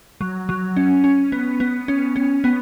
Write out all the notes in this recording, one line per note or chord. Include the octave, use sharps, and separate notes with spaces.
F#3
F#3
C#4
C#4
B3
B3
C#4
C#4
B3